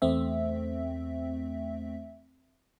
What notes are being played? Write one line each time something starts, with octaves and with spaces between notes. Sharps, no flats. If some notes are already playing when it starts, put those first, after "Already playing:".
E2 A3 C4 E5